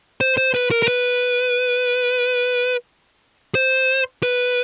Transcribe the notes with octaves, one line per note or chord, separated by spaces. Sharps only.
C5
C5
B4
A#4
A#4
B4
C5
B4